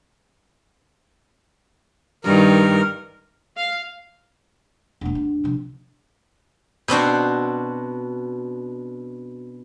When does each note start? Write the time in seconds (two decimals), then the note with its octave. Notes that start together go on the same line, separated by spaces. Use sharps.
2.24 G2 D#3 A#4
3.57 F5
5.01 E1 A3 D4 F#5
5.15 D2 D4
5.44 C3 F3
6.88 B2 C4 D4 F#4